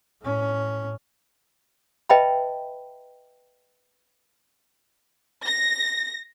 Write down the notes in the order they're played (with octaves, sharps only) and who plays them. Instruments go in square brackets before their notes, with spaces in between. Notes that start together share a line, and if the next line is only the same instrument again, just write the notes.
[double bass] A2 C#4
[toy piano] B4 D#5 E5 G5 A5 B5
[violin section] A#6